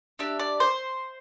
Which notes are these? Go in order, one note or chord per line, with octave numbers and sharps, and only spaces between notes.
D4 G4 E5
D5
C5